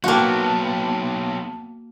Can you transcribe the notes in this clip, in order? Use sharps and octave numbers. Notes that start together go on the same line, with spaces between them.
F#3 A#3 B3 F#4 F5 G5 A5